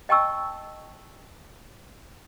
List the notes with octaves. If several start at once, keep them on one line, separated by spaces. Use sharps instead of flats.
D#5 G5 A5 C#6 E6